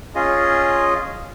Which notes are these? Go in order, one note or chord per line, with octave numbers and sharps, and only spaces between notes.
C#4 F4 G#4 D#5